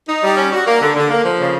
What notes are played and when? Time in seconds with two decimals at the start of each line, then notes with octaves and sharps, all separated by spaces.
0.09 D#4
0.23 G3
0.37 C#4
0.52 F#4
0.67 A#3
0.81 D3
0.96 D3
1.10 A#3
1.24 F3
1.39 C#3